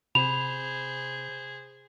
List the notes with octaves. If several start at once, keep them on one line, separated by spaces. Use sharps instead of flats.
C3 G#4 C5 B5 F7